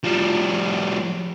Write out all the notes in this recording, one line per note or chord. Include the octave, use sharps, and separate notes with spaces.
F3 G3